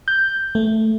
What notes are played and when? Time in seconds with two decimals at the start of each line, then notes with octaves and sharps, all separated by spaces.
0.08 G6
0.55 A3